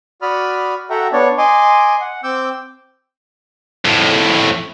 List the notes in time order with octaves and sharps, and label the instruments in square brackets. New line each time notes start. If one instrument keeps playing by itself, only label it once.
[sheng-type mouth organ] F#4 D5 B5 D#6 F6
F#4 A4 E5 F#5 G5 A#5
B3 D4 C#5 D5
D#5 G#5 C6 D6
F#5
C4 D6 E6 G6
[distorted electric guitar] F2 A2